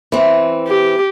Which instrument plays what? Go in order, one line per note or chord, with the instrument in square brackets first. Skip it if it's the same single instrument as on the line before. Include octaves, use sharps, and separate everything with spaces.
[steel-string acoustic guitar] E3 C4
[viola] G4